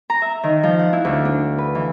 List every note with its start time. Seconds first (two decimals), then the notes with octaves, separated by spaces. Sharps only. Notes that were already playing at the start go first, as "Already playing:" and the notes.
0.10 A#5
0.22 E5
0.43 D#3
0.63 F3
0.79 F#5
0.93 E4
1.05 D2
1.25 D4
1.58 B4
1.75 E3